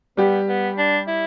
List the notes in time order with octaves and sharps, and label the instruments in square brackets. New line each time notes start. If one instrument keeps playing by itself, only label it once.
[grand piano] G3 G4 [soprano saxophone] B3
[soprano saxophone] B3
D4
E4